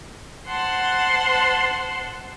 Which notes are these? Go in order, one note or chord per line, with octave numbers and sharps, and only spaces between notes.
C5 F#5 A5 C6